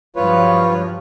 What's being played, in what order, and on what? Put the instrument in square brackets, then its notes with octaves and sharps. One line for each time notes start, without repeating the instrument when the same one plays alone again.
[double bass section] G2 F3 F#3 [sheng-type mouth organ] F4 B4 C#5